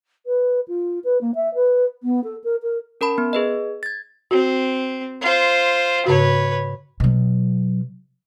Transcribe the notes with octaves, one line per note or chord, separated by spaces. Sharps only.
B4
F4
B4
A#3
E5
B4
B3
A4
A#4
A#4
C#4 A#4 A5 B5
B3
G#4 B4 D#5
G#6 A6
C4 F#4
F4 C5
G#2 C#3 F#4 B4 C#5
B2 F#3